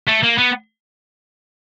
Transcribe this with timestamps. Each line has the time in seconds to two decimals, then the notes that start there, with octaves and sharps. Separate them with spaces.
0.08 A3
0.24 A#3
0.39 B3